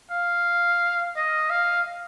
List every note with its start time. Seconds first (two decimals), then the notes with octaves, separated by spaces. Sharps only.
0.11 F5
1.16 D#5
1.50 F5